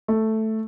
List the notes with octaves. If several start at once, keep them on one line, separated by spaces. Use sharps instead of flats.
A3